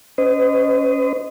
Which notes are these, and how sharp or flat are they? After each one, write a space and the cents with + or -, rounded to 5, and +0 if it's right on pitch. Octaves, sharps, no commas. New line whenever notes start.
C#4 +0 C5 -45 D#5 +0